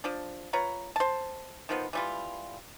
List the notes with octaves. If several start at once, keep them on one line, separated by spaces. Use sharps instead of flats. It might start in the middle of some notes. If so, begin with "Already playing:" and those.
F3 D4
F4 B4 C#5 A#5
C5 A5
D#3 F3 B3
E3 G3 F4